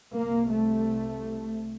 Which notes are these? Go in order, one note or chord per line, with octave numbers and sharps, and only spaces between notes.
C2 C3 A#3
A3